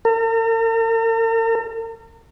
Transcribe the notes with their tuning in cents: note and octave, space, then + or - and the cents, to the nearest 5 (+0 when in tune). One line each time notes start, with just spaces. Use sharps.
A#4 -45